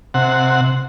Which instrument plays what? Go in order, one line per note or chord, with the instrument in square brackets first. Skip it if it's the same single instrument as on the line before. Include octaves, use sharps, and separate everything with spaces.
[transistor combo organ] C3 F#5